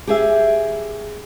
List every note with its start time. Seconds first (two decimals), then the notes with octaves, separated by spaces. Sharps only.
0.07 G4 G#4 E5